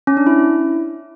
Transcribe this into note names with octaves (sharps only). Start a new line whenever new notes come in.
C#4
D4
E4